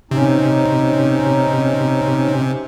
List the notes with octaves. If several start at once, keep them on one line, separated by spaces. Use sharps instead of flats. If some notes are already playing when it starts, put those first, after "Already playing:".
C3 C#4 D#4